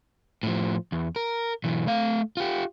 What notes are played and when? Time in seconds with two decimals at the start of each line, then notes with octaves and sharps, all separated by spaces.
0.43 A2 F3
0.92 E2
1.16 A#4
1.64 B1 E3
1.87 A3 F5
2.37 F4 G4